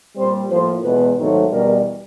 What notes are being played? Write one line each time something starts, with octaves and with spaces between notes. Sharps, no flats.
A#2 G3 C4 C5
A2 F3 A#3 C5
E2 B2 G#3 B3 B4
G#2 D#3 F#3 A3 C4
E2 B2 G3 A#4